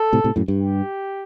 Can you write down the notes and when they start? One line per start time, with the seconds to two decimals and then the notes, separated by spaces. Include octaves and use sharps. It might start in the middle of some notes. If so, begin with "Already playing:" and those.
Already playing: A4
0.13 A2 C3
0.24 A2 C3
0.36 F#2 A2
0.48 G2
0.61 G4